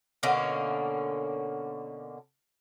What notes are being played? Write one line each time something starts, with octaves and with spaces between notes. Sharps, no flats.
B2 D3 A#3 C#4